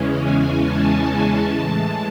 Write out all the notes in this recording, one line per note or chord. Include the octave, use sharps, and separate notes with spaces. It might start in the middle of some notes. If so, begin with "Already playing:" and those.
Already playing: E2 C#3 E3 G#3 C#4
G#5
A5
A2 E3 G#3